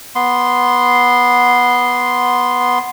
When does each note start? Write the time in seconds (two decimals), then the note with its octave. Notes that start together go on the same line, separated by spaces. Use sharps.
0.15 B3 C6